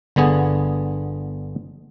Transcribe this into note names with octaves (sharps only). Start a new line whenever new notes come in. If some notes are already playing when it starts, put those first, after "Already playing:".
G1 D3 B3 G#4